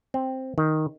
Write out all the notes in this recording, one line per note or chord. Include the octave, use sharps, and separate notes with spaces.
C4
D#3